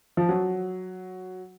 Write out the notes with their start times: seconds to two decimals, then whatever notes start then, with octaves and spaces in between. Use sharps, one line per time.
0.17 F3
0.29 F#3